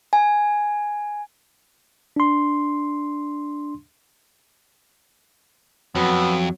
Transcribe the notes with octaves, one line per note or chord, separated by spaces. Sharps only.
G#5
D4 C6
F2 F#3 B3